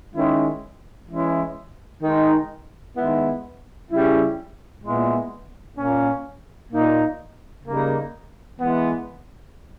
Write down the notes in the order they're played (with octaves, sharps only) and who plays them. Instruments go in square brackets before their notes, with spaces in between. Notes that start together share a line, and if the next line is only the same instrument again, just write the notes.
[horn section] D#3 G#3 C#4 E4
E3 G#3 C#4 E4
D#3 G#3 D#4
D#3 G#3 B3 E4
C#3 G3 C#4 E4
A#2 G#3 B3 E4
A#2 A#3 C#4
A#2 A#3 D#4
C#3 G3 A#3 D#4
E3 G#3 B3